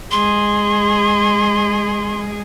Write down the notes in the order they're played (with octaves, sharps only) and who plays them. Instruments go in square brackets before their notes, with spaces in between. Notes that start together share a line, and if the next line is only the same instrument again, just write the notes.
[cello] G#3 G#4 [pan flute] C6